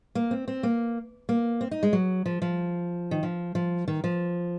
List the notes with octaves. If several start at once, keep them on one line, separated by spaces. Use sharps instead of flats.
A#3
C4
C4
A#3
A#3
C4
D#4
G#3
F#3
F3
F3
D#3
F3
F3
D#3
F3